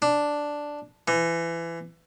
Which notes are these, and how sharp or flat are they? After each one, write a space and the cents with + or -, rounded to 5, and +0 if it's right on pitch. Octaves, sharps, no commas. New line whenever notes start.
D4 +0
E3 +25